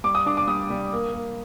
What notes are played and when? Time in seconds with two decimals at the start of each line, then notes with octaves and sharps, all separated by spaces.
0.04 G3 D6
0.15 D#6
0.26 D4 D6
0.37 D6
0.47 G3 D#6
0.70 G3
0.92 A#3
1.13 A#3